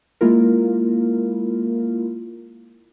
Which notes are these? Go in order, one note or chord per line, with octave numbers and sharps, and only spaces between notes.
G#3 A#3 E4 F4 A#4